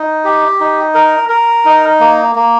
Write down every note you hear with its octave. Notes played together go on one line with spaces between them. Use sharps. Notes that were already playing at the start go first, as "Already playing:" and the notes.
Already playing: D#4
G4
D#4
A#4
A#4
D#4
A#3
A#3